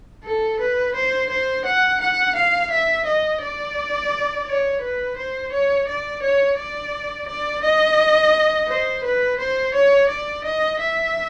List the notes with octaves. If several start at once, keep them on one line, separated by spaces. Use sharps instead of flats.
A4
B4
C5
C5
F#5
F#5
F5
E5
D#5
D5
C#5
B4
C5
C#5
D5
C#5
D5
D5
D#5
C5
B4
C5
C#5
D5
D#5
E5